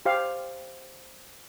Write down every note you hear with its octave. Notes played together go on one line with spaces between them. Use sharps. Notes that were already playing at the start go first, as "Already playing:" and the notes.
G4 C5 F5